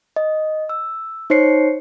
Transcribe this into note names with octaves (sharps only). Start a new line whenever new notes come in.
D#5
E6
D#4 C5 C#5 C7 C#7